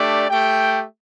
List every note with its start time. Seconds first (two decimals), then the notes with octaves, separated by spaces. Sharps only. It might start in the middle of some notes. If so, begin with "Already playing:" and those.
Already playing: A3 D4 G4 D5
0.29 A3 G4 G5